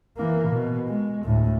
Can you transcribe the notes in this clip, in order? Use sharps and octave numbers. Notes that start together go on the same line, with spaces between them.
E3 A#3
B2
G#3
D2 A2